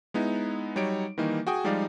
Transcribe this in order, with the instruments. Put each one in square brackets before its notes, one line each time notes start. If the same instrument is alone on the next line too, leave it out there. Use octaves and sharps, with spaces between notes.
[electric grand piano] G#3 B3 D#4 E4
F#3 G3 D#4 C#5 D7
D#3 E3 G3 A#3 D#4
F#4 G#4 G5 G#5 D#6
F3 G3 G#3 D#4 D5 F5